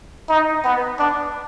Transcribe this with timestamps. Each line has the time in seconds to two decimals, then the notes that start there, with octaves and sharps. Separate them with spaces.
0.29 D#4
0.64 B3
0.99 D4